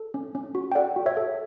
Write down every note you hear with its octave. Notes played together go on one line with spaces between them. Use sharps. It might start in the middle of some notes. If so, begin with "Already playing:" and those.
Already playing: A4
C#4
C#4
F#4
G5
A4 D5 F#5
F#4
C#5 E5
A4